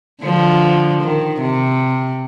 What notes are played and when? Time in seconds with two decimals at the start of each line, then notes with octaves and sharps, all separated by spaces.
0.23 D3 F3
1.02 D#3
1.41 C3